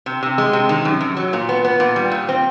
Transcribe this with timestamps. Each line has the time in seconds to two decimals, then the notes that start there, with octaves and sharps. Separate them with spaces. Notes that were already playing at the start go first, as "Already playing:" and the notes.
0.06 C3
0.23 C3
0.38 G#3
0.53 C3
0.69 D#3
0.85 F#2
1.01 F#2
1.17 F#3
1.33 A#2
1.49 B3
1.64 B3
1.80 A#2
1.96 G3
2.12 A#2
2.29 C4